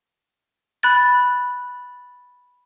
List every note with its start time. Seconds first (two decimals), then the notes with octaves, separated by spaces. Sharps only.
0.83 B5 F#6 A6